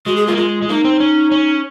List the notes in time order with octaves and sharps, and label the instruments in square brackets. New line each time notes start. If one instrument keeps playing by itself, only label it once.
[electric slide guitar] G#3 [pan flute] F#4
[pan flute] G#4
[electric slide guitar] A#3 [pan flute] F4
[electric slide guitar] G#3 [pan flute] F4
[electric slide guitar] G#3
[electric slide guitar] A#3 [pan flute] D#4
[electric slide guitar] C4
C#4
C#4